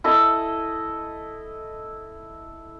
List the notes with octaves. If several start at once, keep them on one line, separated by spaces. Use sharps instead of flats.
E4 A4 D#5